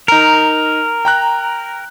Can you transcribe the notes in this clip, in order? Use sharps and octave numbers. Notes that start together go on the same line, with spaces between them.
D#4 A#4 A#5
G5 A#5 F#6